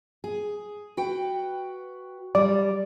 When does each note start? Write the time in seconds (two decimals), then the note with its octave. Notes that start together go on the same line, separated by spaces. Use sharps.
0.24 G#4
0.97 F#4 B4 G5
2.35 G3 D5